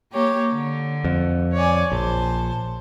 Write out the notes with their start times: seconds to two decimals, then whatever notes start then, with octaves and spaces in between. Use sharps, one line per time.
0.13 A#3 G4 C#5
0.53 D3
1.04 F2
1.54 C#5 D5 G#5
1.92 A#1 C5 A5